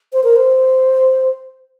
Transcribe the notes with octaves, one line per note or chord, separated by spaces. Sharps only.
C5
A#4
C5